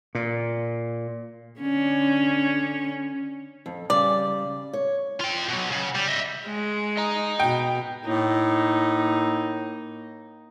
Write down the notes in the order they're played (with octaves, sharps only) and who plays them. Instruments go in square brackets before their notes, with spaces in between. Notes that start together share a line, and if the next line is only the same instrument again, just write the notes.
[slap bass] A#2
[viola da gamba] D3 C#4
[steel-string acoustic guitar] F2
[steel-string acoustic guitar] C#3 G3 [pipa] D5
[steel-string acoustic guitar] C#5
[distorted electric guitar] F4 G5
B2 F#3
C#3
G3
D#5 E5
[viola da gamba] G#3
[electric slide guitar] D#5 A#5
[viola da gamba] B2 [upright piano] G5
[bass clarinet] A2 [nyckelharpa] A#3 D#4